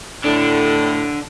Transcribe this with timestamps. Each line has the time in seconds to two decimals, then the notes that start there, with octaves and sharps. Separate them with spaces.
0.24 A2 D3 D4